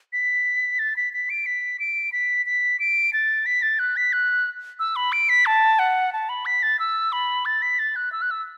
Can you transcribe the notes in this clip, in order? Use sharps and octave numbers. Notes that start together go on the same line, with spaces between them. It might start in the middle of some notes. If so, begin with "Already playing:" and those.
B6
A6
B6
B6
D7
B6
D7
B6
B6
D7
A6
B6
A6
F#6
B6
F#6
E6
B5
D7
B6
A5
F#5
A5
B5
B6
A6
E6
B5
A6
B6
A6
F#6
E6
F#6
E6